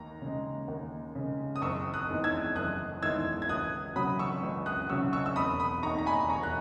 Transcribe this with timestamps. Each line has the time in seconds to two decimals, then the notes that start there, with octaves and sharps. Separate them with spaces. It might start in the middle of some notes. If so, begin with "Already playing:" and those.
Already playing: D#2 A#5
0.22 C#3 G#3
0.68 D#2
1.15 C#3 G#3
1.56 D#6
1.62 F#1 C#6 E6
1.94 D#6 F#6
2.09 E2 D#3 G#3
2.24 E6 G#6
2.55 F#1 D#6 F#6
3.02 E2 D#3 G#3 E6 G#6
3.42 G#6
3.49 C#2 D#6 F#6
3.96 C#3 F#3 B5 D#6
4.19 C#6 E6
4.43 C#2
4.66 D#6 F#6
4.89 C#3 F#3 C#6 E6
5.13 C#6 E6
5.26 E6
5.36 E1 B5 D#6
5.60 B5 D#6
5.83 D#2 D#3 A#5 C#6
5.99 A#5
6.06 G#5 B5
6.30 E1 A#5 C#6
6.43 F#6